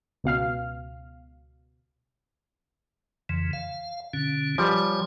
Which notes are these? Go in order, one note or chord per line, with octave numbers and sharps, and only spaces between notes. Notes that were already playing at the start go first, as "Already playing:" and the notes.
C#2 B2 F5 F6
F2 C#3 E3
F5
B2 D3 C#4
F3 G3 B4 C#5 G#5